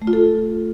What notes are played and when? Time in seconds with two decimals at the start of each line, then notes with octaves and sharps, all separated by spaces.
0.02 A3
0.07 F4
0.13 A4